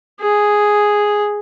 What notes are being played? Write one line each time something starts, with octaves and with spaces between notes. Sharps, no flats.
G#4